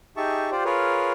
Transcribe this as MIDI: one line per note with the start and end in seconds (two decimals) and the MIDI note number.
0.17 0.50 63
0.17 0.50 67
0.17 0.50 68
0.17 0.50 76
0.17 0.50 81
0.17 0.50 85
0.51 0.64 65
0.51 0.64 67
0.51 0.64 72
0.51 0.64 74
0.65 1.12 65
0.65 1.12 68
0.65 1.12 70
0.65 1.12 71
0.65 1.12 73